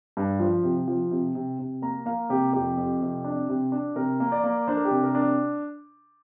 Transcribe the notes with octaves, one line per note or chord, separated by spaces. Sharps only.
G2
F3
C3
F3
C3
C3
C3
A#3 A#5
A#3 F5
C3 G4
F2 G4
F2
C3
D4
C3
D4
C3 A#4
A#3
D5
A#3
D4 C5
A#4
G4
C3
A#4
D4